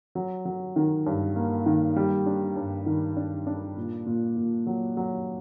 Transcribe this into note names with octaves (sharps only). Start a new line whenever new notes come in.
F#3
F#3
D#3
G2
A#3
D#3
G3
D4
G2
D#3
D4
D4
A#2
A#2
A#2
F#3
F#3